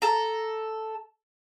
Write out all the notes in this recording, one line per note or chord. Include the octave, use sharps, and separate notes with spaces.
A4 A#5